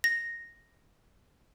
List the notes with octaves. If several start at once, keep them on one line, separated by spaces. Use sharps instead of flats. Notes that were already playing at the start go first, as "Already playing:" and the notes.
A#6